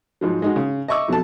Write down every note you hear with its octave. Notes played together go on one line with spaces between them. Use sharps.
G#2 F3 F#3
G#3 D#4 F#4
C#3
D#5 E5 C#6 D6 E6
F2 B2 F#3 A4 A5